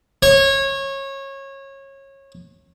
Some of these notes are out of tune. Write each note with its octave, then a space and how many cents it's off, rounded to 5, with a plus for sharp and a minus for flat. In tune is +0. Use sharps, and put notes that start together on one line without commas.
C#5 -25